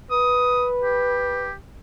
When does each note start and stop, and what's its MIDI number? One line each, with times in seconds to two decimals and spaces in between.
0.11 1.51 71
0.11 0.66 87
0.83 1.53 67